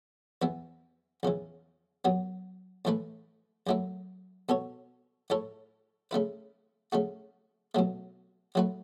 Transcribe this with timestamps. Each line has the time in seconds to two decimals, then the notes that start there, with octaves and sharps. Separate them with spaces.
0.42 E2 E3 B3 E4
1.23 E2 C#3 E3
2.05 F#2 F#3 B3
2.85 A2 E3 A3 E4 B4
3.67 F#2 F#3 A3 E4
4.49 B2 B3 A4 C#5
5.30 A2 A3 E4 A4 C#5
6.11 C#3 A3 E4 B4
6.92 C#3 A3 F#4
7.75 B2 F#3 A3
8.55 F#3 A3 F#4 B4